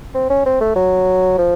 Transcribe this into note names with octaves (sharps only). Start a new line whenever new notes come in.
C4
C#4
C4
A3
F#3
F3